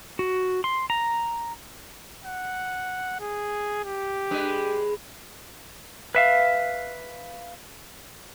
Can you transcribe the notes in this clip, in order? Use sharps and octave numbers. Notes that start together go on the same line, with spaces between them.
F#4
C6
A#5
F#5
G#4
G4
G#3 D4 B4
B4 E5 F5